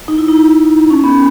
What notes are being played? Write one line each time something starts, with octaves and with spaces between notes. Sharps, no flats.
D#4
E4
D#4
C#4
B3